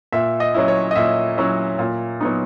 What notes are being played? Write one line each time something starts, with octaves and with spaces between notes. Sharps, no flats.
A#2 E5
D#5
F#3 C#4 E4
C#5
D#5
A#2 E5
F#3 C#4 E4
A#2
F#3 B3 D#4